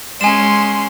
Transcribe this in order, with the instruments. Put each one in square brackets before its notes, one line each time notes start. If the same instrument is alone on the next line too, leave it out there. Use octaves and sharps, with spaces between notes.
[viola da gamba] G#3 C#4 [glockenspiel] G#5 E7 [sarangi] C6